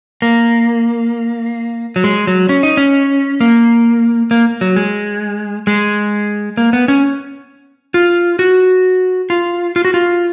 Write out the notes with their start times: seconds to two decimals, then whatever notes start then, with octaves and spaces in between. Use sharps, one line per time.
0.22 A#3
1.96 F#3
2.04 G#3
2.27 F#3
2.49 C#4
2.63 D#4
2.77 C#4
3.41 A#3
4.31 A#3
4.61 F#3
4.76 G#3
5.67 G#3
6.57 A#3
6.73 B3
6.88 C#4
7.94 F4
8.39 F#4
9.30 F4
9.76 F4
9.85 F#4
9.94 F4